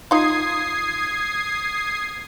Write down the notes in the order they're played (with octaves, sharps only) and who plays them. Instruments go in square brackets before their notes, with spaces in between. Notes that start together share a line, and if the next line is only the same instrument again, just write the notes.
[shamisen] D#4 F4 [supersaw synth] D#6 G#6 C7